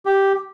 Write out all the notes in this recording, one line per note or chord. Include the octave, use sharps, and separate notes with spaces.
G4